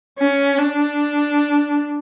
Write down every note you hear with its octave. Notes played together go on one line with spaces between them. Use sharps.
C#4
D4